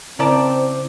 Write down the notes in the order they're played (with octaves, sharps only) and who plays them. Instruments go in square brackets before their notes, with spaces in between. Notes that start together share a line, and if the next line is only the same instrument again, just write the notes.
[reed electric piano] C#3 E4 D6 [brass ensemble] C4 [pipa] A#4 D5 A5 [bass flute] C5